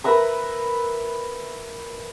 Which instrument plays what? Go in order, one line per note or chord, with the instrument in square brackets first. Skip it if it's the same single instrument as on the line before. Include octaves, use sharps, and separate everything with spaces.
[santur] A#4 B4 E5 A#5